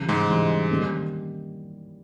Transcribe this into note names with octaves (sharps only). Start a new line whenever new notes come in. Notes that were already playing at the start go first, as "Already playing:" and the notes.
Already playing: C#3 E3 G3
G#2 G#3
C#3 E3 G3
D#3 G3 A#3 C#4